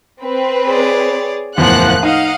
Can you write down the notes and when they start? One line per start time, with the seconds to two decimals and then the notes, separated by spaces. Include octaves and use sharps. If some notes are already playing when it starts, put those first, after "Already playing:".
0.22 C4 B4
0.65 G#4 C#5 D5
1.58 F#1 E2 A2 F3 A#3 F#5 F#6
2.03 D#4 D#5 F5 F#5